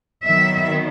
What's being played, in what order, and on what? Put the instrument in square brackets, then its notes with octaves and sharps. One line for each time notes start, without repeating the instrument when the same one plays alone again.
[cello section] D#3 F#3 B3 E5